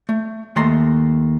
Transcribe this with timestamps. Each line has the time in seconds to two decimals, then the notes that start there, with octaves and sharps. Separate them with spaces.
0.09 A3
0.56 D#2 A3 A#5 C6